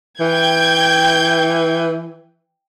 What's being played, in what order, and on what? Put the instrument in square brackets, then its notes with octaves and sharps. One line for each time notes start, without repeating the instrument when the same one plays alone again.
[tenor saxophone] E3 [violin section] G5 G6 G#6